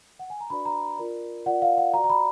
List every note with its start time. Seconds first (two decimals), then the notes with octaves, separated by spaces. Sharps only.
0.19 F#5
0.30 G#5
0.40 A#5
0.50 D4 F#4 B4 D5 B5
0.65 A#5
0.98 F4 A#4 D5
1.46 F4 A#4 D5 F#5
1.62 F5
1.78 F#5
1.94 F#4 D5 A#5
2.04 A#5
2.10 B5